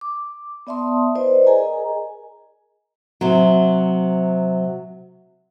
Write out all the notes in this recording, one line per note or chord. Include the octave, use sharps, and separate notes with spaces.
D6
B3 D5 E5 A5 C6 D#6
E4 B4 C5 D5 D#5
G#4 A#4 D#5 G#5 A#5
C3 F#3